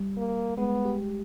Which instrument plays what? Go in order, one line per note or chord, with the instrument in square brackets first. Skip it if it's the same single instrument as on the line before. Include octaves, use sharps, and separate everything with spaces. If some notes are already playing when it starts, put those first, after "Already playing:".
Already playing: [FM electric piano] G3
[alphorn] A#3
[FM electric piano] G#3 [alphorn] B3
[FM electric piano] G4